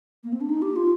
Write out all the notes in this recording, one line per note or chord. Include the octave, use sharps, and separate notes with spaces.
A#3
C4
D4
D#4
G4
F4